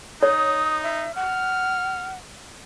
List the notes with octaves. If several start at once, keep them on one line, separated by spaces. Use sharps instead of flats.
D#4 C#5 D#6
E5
F#5 F6